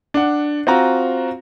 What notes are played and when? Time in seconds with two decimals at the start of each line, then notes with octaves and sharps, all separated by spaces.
0.14 D4 F#5
0.67 C4 F4 F#4 A#5